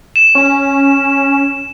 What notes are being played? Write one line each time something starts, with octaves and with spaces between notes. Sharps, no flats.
E7
C#4